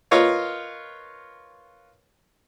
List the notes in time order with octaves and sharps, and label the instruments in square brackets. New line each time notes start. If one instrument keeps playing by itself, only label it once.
[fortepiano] F4 A#4 B4 C#5 D#5 F5